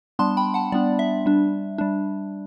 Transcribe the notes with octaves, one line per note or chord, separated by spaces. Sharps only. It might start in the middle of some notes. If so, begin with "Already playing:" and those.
G3 B3 D4 A5 C6
G5 B5
F#5 A5
G3 B3 D4 D5
E5
G3 D4
G3 D4